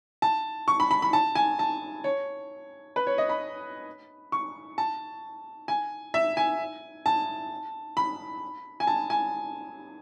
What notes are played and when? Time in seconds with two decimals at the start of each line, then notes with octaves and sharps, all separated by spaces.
0.22 A5
0.68 C#6
0.80 B5
0.91 B5
1.02 B5
1.13 A5
1.35 G#5
1.59 A5
2.04 C#5
2.96 B4
3.07 C#5
3.18 D#5
3.29 B5
4.32 C#6
4.78 A5
5.68 G#5
6.14 E5
6.37 G#5
7.06 A5
7.97 B5
8.80 G#5
8.87 A5
9.10 G#5